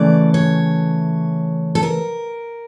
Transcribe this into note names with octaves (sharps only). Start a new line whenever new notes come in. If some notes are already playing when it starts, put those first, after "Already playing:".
Already playing: C#3 E3 A3 D5
C#5
A4
A#4